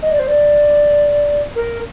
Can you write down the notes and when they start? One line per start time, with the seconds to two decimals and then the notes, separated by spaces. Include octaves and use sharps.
0.02 D#5
0.11 D5
0.19 C5
0.28 D5
1.56 A#4